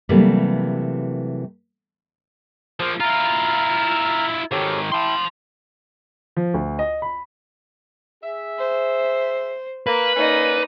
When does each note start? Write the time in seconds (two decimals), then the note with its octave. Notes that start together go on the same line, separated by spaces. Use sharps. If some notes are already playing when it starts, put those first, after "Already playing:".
0.09 C3 E3 F#3 G3 A3 A#3
2.80 F3 A#3 C5
3.00 E4 F4 A#5 F6
4.52 G#2 D#3 G4 A4 C#5
4.92 E4 G5 A5 C6
6.37 F3
6.54 D2
6.79 D#5
7.02 B5
8.22 G#4 E5
8.59 C5
9.87 A#3 B4
10.16 A#3 C#4 D#4 D5 D#5